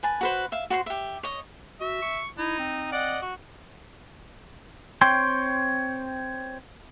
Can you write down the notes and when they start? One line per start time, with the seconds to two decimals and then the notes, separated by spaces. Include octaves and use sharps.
0.03 B4 G#5 A5
0.21 F#4 B4 C5
0.52 E5 F5
0.70 F#4 C5 B5 C6
0.86 G4 E5
1.23 C#5 D#5
1.81 F#4 E5
2.02 C#6
2.38 D#4 E4
2.59 C4
2.92 D5 D#5 F#5
3.22 F#4
5.01 C4 C#5 G5 C6